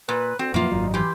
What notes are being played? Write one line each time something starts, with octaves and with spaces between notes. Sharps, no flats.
A#2 B4
D2 C4
F#2 A#2 F3 A#3 B3 E4 F4
G#1 F#2 F#3 G3 D#4
E3 G4 G#5 B5 C6